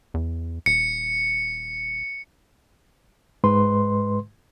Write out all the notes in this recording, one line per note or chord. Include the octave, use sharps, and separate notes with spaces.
E2
D#1 C#7
G#2 G#3 B4 C6